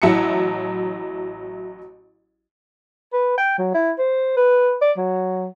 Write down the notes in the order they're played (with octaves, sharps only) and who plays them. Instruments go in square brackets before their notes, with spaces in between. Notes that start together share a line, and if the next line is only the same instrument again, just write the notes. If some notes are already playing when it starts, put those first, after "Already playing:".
[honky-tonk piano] A1 F#3 E4 E5 A5 C#7
[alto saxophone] B4
G5
F#3
E4
C5
B4
D5
F#3